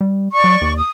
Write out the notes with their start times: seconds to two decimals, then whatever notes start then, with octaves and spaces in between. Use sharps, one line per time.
0.01 G3
0.32 D5 C#6
0.44 F#3
0.62 D#2
0.78 D#6